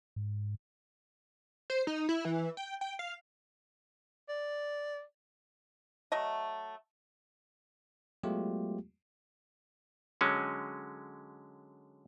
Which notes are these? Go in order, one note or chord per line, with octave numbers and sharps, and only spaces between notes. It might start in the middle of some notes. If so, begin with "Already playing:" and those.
G#2
C5
D#4
E4
E3
G5
G5
F5
D5
F#3 A3 D#5
F#3 G#3 A3 B3 F4 G4
D3 F#3 G#3 C#4